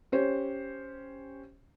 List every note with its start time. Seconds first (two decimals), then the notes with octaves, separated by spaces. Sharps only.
0.12 C#4 G4 C5 C#5